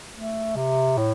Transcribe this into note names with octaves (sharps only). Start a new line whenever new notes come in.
A3
C3
A2